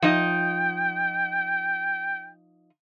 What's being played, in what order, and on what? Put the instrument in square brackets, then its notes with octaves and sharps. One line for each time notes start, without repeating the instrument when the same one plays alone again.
[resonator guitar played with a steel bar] F3 D#4 D#5 [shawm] G5